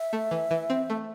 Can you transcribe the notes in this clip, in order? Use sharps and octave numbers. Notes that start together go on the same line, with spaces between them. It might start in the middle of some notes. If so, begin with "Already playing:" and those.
Already playing: E5
A3
E3
E3
C4
A3